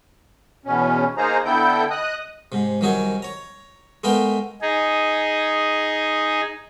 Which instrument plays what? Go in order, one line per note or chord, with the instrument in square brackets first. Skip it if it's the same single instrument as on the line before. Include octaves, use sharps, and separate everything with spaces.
[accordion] E2 B2 C#4
A#3 D#4 G#4 C5 A#5
D3 B3 E4 A4 G5 G6
D#5 D#6 F#6
[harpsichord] G#2 C3
C2 D#3 F#3 D#4 G#4 G#5
C#5 A#5
G#3 A3 B3 A#4 F5 G5
[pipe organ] D#4 G#4